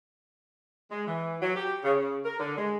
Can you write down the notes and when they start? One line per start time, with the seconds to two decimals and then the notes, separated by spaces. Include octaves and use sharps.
0.91 G#3
1.07 E3
1.42 F#3
1.56 G4
1.84 C#3
1.98 C#3
2.25 A#4
2.39 D3
2.58 G#3